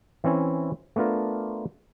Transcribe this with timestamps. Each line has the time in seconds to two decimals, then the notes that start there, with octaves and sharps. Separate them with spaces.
0.24 E3 C4 C#4 E4
0.96 A3 B3 D4 F4 A#4